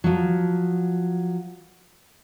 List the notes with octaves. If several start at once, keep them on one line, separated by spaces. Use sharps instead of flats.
F3 F#3